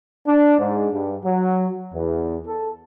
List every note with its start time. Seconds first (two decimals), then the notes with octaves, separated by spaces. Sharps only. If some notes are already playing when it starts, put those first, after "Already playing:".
0.27 D4
0.59 G#2
0.93 G2
1.24 F#3
1.94 E2
2.47 A4